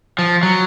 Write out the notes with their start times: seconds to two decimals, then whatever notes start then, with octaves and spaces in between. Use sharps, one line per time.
0.19 F3
0.43 F#3